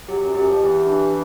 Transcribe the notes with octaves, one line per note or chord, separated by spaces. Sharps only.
F#2 F#3 G4
F#2 F#3
F#2 F#3 G4
F2 F3
E2 E3 G4
D4